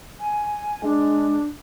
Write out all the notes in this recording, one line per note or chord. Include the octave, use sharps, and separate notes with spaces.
G#5
G#3 D4